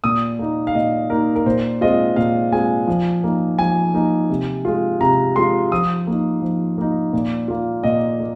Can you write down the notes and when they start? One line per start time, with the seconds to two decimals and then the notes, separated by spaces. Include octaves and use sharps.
0.04 A#2 D#6
0.39 A#3 D#4
0.67 F5
0.75 A#2 D#5
1.10 A#3 D#4 A#4
1.36 A#4
1.46 A#2 C5
1.81 G#3 C4 F4 D#5
2.16 A#2 F5
2.52 G#3 C4 F4 G#5
2.87 F3
3.24 A#3 D#4
3.59 F3 G#5
3.94 A#3 D#4
4.29 C3
4.65 G#3 F4
5.01 C3 A#5
5.36 G#3 F4 C6
5.71 F3 D#6
6.07 A#3 D#4
6.42 F3
6.78 A#3 D#4
7.13 A#2
7.48 A#3 F4
7.84 A#2 D#5
8.20 A#3